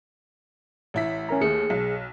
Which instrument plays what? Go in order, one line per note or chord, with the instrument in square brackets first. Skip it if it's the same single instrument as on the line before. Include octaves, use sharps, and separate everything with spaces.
[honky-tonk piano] A1 E4 B6
[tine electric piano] C#4 A#4 A#5
[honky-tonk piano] D#2 A3 [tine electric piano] G#4 C#7
[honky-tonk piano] B1